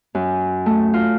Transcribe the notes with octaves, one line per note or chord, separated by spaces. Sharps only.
F#2
A3
F4